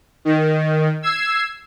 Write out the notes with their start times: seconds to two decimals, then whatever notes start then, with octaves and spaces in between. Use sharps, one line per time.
0.25 D#3
1.02 E6 G#6 C7